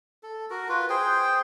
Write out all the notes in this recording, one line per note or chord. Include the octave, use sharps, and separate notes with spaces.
A4
F#4 A#4
F4 B4
G#4 C5 G5